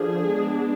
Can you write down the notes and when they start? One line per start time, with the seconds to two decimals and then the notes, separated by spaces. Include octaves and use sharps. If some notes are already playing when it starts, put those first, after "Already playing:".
Already playing: D3 F3 D4 G#4
0.29 G#3 B3 D4